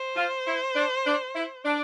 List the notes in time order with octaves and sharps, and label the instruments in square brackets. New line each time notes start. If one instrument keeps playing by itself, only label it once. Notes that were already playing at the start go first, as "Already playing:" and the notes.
Already playing: [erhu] C5
[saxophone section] F4
E4
D4
D4
E4
D4